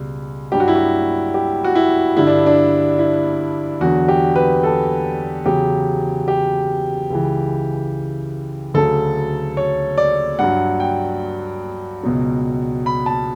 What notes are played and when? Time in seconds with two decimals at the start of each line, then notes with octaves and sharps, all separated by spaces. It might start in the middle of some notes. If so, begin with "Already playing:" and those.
Already playing: C#2 B2 G3
0.52 G2 F#3 G4
0.60 F#4
0.68 E4
0.75 F#4
1.34 G4
1.64 F#4
1.75 E4
2.16 G2 D3 G3 E4
2.27 D4
2.46 D4
2.99 E4
3.81 E2 D3 F#3 F#4
4.08 G4
4.36 B4
4.63 A4
5.45 E2 C#3 F#3 G4
6.28 G4
7.10 C#2 C#3 E3
8.74 D2 C#3 F#3 A4
9.57 C#5
9.98 D5
10.39 G2 F#3 F#5
10.80 G5
12.03 C#2 B2 F#3
12.86 B5
13.06 A5